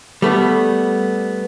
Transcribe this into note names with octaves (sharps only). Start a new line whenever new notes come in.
G3 A3 B3